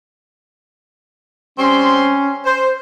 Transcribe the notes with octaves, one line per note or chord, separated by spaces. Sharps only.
G3 C4 C#4 C6
C5